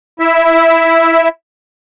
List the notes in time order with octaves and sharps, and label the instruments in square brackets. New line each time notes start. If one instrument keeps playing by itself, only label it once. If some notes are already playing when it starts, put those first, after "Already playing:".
[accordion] E4 E5